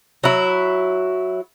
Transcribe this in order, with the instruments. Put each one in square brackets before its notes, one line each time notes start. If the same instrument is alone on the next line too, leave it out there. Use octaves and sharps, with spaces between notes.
[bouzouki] F#3 E4